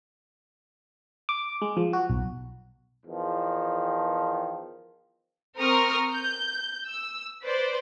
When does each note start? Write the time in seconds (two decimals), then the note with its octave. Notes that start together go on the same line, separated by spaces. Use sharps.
1.29 D6
1.62 G#3
1.77 F3
1.93 F#4
2.10 B1
3.06 E2 D#3 F3
5.58 C4 A#4 C#6 D#6 F6
6.13 G6
6.87 E6
7.43 B4 C5 D5